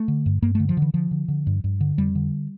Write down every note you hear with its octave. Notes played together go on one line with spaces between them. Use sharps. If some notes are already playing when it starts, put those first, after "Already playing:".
Already playing: A3
D3
G2
G2 A#3
D3 A3
F3
D3 E3
D3 F3
D3
D3
G2
G2
D3
F2 G3
D3